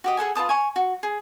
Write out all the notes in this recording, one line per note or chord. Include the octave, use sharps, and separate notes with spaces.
F#4 G4 D#5
G#4 A4 F#5 G#5
F4 B4 A5 D#6
G#5 C#6
F#4
G#4